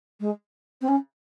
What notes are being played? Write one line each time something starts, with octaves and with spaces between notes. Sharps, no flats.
G#3
C4
C#4